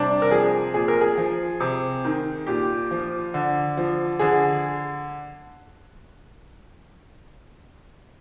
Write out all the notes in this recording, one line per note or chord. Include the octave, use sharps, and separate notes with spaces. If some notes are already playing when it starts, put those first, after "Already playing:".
Already playing: C3 G3 D4
A#4
F3 G#4
A#2 G#4
A#4
G#4
F3
C3
D#3
A#2 G4
F3
D3
F3
D3 G#4